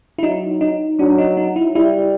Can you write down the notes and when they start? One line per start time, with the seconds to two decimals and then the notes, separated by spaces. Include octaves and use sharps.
0.18 E4
0.23 F#3 D#4
0.61 D#4
0.99 F#3 D4
1.18 D#4
1.37 D#4
1.56 E4
1.75 G3 E4